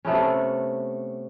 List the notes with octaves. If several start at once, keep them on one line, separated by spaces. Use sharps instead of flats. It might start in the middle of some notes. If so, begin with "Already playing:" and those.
C3 A3 B3 C#4